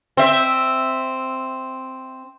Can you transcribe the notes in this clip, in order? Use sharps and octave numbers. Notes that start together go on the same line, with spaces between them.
C4 E5